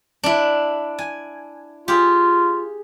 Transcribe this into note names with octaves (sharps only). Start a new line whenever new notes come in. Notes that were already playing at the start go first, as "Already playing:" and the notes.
D4 E4
G#5
F4 G4 G#4